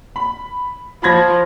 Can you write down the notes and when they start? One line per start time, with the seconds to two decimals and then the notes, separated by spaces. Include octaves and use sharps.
0.16 B5
1.03 F3 B5 G#6 A#6